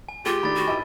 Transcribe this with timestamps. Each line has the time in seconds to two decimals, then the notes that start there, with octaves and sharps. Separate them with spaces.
0.09 G#5
0.26 G#3 F4 G4
0.43 D#3 A3 D4 B5 A6
0.55 F#4
0.67 G#1 E4 D#5 G#5